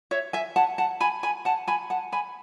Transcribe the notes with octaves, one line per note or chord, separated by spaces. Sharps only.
C#5 E5
E5 G#5
F#5 A5
F#5 A5
G#5 B5
G#5 B5
F#5 A5
G#5 B5
F#5 A5
G#5 B5